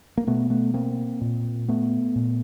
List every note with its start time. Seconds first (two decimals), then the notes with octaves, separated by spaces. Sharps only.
0.17 A#3
0.27 B2 A3 B3
0.50 A3 B3
0.74 A#3 C4
1.21 A#2
1.68 A3 B3
2.16 A#2